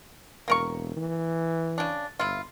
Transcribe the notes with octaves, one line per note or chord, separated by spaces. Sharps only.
E1 A#3 A#4 C#6
E3
C#3 D4
G1 E4 F4